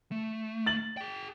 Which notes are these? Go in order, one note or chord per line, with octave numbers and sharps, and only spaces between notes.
A3
A6 F#7
G#4 G5